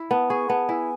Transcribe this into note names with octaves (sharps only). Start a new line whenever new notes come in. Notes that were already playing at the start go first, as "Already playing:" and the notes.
Already playing: E4
B3 A5
G#4 C#6
B3 A5
E4 G#5